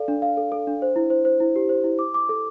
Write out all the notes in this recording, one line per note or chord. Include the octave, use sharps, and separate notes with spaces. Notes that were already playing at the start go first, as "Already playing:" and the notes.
Already playing: A4 D5 F5
D4
F5
A4
A4
D4
C5
E4
C5
C5
E4
G4
C5
E4
D6
D6
A4